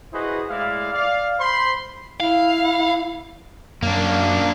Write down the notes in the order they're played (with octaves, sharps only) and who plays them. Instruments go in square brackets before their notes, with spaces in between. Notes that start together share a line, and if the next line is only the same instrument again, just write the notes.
[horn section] E4 F#4 G#4 B4 C5 D#5
A2 G#3 E4 D5 F5
D5 F5
C5 B5 C6
[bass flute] E4 [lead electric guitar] F5
[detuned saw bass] F#2 [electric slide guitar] A#3 D4